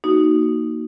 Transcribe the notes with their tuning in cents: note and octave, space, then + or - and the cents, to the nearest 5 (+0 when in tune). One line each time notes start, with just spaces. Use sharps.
A#3 +0 D#4 +0 F#4 +5